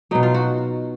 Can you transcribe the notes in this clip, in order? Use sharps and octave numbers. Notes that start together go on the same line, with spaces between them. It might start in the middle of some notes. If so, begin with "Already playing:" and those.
B2 F#3 D#4
F4
F#4